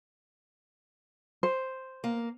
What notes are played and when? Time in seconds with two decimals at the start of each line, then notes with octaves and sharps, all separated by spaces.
1.43 C5
2.04 A#3